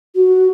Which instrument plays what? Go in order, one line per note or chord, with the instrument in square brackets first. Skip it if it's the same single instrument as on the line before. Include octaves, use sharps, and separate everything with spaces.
[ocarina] F#4